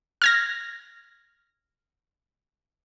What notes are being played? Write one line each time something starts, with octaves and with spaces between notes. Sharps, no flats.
F6 G#6 A#6